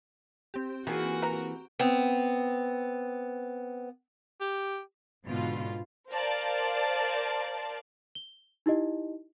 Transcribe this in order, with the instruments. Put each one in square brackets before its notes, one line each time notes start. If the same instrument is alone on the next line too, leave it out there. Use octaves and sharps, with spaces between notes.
[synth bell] C4 G4
[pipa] D#3 [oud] E3 A#3 G#4 [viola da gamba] F#4
[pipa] B4 F#5 A#5
[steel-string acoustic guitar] B3 C4
[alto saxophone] G4
[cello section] G#2 B2 D3 F4
[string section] A#4 C5 D5 F5 A5
[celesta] G7
D#4 E4 G4 D#5